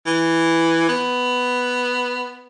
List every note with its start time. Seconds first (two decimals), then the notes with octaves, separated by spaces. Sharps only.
0.06 E3
0.89 B3